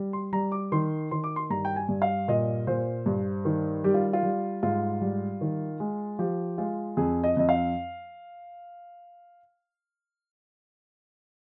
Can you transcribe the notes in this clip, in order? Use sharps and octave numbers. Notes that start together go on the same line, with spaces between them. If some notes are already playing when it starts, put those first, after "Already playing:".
Already playing: G3
C6
G3 A#5
D6
D#3 C6
D#3 C6
D6
C6
G2 A#5
G5
G#5
G2
F5
A#2 D#5
A#2 C5
G2
D#3
G3 G4
F4
F4
G3
G#2 F4
G3
D#3
G#3
F3 G4
G#3 F4
F2 G#4
D#5
F2 D#5
F5